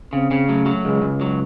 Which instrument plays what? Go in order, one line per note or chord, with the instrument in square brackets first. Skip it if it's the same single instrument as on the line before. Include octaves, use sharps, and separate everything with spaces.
[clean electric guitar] C#3 [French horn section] C4
[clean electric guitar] C#3
[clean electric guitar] F#3 [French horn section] A3
[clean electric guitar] F#3
[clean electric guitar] C#2 [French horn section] G#3
[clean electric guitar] C#2
F#3